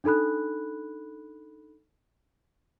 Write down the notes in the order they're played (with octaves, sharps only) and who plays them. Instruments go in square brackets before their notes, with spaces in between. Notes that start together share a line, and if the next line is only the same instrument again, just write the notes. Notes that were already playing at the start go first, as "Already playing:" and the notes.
[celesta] D4 D#4 A4 B5 F#6